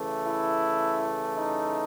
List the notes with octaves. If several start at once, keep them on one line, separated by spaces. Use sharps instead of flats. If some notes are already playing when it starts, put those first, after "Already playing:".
Already playing: C#3 E3 A3
E4
D#4